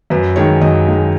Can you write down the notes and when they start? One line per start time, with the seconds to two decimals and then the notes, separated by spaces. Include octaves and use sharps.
0.10 F#2 B4
0.36 D#3 G#3 C#5
0.61 F#2 D#5
0.87 D#3 G#3